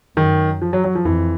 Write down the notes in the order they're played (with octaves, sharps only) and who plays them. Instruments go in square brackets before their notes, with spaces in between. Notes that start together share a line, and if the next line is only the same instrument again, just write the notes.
[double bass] F#2 [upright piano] D#3
[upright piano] F3
F#3
F#3
F3
[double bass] F2 [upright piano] E3